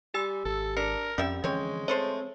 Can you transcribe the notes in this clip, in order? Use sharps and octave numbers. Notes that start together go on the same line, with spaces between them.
G3 G4 G#5 E6
G#1 A4
D4 A#4 C#7
F2 G3 C4 C#4 E5
D3 E3 F3 G#3 C4 C#5
A3 C4 A4 C5 C#5